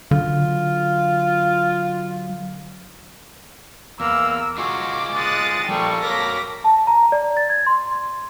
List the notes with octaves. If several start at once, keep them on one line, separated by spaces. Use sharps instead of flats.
D3 F#3 F4
E2 A#3 E6
D#4 F4 F#4 G#4 D6
G#3 D#6 F#6 A6
F3 G3 A#3 A4 G5 C#6
A#3 A#4 C#5 D6 A#6 B6
A5
A#5
D5
A6
G#6
C6